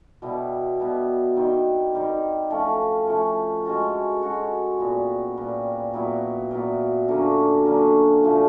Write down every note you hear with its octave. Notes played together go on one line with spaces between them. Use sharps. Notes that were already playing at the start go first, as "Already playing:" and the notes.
B2 G3 B3 E4
B2 G3 B3 E4
D#3 G3 C4
D#3 G3 C4
F3 A3 C#4 F4
F3 A3 C#4 F4
G#3 C#4 F#4 A4
G#3 C#4 F#4 A4
A#2 G3 B3
A#2 G3 B3
A#2 F#3 B3 E4
A#2 F#3 B3 E4
D3 F#3 A#3 C#4
D3 F#3 A#3 C#4
A#2 F3 A3 C4